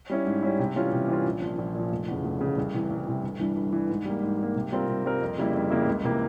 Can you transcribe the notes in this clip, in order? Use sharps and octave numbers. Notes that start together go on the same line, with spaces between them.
G3 C#4 E4
G#2
G3 C#4 E4
C3
E3 G3 C#4 F4
C3
E3 G3 C#4 F4
A#1
A#2 F3
A#1
A#2
F3
F1
E2 C#3
F1
E2 C#3
C2
C3 E3
C2
C3 E3
G1
G2 E3
G1
G2 E3
G#2
G3 A#3
G#2
G3 A#3
C3
G3 C4 F4 A#4
C3
G3 C4 F4 A#4
F2
C#3 G3 A#3 E4
F2
C#3 G3 A#3 E4
C#2
C3 E3 A#3